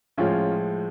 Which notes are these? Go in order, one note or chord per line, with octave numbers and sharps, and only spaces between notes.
A2 F3 G#3 C#4 F4